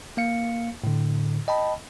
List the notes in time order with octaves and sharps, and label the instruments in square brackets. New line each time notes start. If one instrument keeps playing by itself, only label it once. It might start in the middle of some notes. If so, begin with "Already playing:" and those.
[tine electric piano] A#3 F5 C#7
A2 D3
D#5 G5 A5 B5